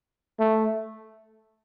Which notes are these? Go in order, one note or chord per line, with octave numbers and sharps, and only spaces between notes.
A3